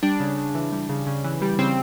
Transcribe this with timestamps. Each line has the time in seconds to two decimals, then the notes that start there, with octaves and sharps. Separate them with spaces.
0.03 G3 D4
0.20 C#3
0.38 C#3
0.55 E3
0.72 G3
0.89 C#3
1.07 C#3
1.24 E3
1.42 G3
1.59 C#3 C4